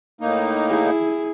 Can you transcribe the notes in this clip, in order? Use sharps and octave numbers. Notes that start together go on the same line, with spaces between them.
A2 A#3 D#4
E4 G#4